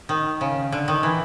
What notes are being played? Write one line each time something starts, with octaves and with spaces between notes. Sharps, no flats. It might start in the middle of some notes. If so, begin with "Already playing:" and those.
D#3
C#3
D3
D#3
E3